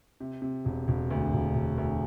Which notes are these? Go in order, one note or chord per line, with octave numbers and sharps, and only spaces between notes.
C3
C3
E1
E1
D2
E1
E1
D2